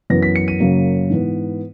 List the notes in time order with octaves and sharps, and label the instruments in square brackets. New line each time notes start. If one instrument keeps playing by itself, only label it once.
[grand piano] F#2 E3 B3 A#6
B6
C#7
D#7
F#2 C#3 F#3 A#3
G#2 E3 B3